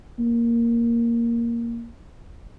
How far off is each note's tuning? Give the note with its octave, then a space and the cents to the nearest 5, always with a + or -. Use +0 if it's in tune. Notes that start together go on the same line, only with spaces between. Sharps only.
A#3 +0